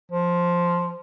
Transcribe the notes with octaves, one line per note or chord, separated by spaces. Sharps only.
F3